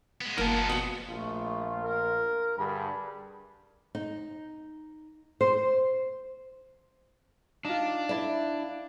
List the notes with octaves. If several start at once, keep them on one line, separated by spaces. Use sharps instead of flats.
G#3 B3
F#1 A#3 A#4 A5
F2 B2 B3
A#1 A3 F4
A#4
G2 D3 G#4 B5
D#4
C5
D4 D#4 F4
E4 D5